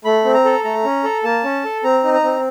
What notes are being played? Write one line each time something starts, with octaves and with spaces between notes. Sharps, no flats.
A3 B5
C4
A#5
A4
A3 A#5
C#4
A4
A#3 A5
C#4
A4
C4 A#5
D#4
A#5
C4